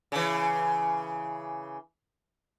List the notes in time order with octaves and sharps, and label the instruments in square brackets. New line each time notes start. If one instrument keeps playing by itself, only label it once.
[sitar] C#3 E3